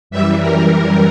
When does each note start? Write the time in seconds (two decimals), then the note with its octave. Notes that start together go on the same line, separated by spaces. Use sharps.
0.10 F#2 E3 G3 E5
0.39 A#4